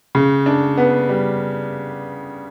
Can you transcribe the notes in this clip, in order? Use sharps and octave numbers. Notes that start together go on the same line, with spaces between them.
C#3
D4
B3
G3